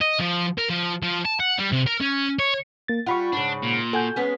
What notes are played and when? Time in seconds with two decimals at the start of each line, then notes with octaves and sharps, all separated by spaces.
0.01 D#5
0.20 F3
0.58 A#4
0.70 F3
1.03 F3
1.25 A5
1.40 F#5
1.58 G3
1.72 C3
1.87 A#4
2.01 C#4
2.39 C#5
2.88 A#3 A6
3.06 G3 F4 F#5 B5 C#6
3.33 G#2 C#3 D4
3.63 A#2
3.93 F#4 A4 G#5 G6
4.16 G#3 B3 C#4